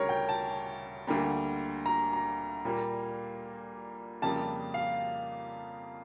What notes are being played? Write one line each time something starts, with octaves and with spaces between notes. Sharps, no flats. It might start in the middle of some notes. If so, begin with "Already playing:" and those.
Already playing: D2 C#3 G3 A#4 C#5
G5
A5
D2 D3 G3 A#3
A#5
A#5
A#2 G3 A#3
F2 C#3 G3 A#3 A5
F5